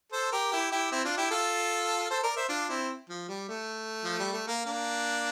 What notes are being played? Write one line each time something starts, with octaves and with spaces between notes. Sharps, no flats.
A4 C5
G4 A#4
E4 G4
E4 G4
C4 E4
D4 F4
E4 G4
F4 A4
A4 C5
A#4 D5
C5 E5
D4 F4
C4 E4
F3
G3
A3
F3
G3
A3
A#3
A#3 D4